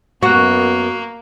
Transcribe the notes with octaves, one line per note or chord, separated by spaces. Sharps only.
F#2 A#3 B3 F#4 C#6 F#6